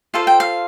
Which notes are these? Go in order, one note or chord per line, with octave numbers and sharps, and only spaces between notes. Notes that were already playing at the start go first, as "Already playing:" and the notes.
F4 A4 C5 F5
G5
F5